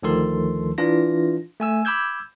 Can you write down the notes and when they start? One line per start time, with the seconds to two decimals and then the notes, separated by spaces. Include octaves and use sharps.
0.03 D2 D#3 F3 A4 C6
0.78 E3 D4 F4 A#6
1.60 A3 G#5 E6
1.85 B5 D6 E6 G6 G#6